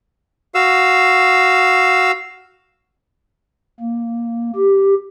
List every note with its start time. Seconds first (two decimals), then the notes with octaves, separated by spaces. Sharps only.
0.55 F#4 F5 E6
3.81 A#3
4.55 G4